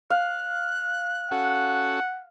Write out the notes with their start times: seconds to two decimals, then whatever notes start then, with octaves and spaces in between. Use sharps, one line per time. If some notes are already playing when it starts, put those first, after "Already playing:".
0.10 F5 F#6
1.31 C#4 F#4 A4 F#5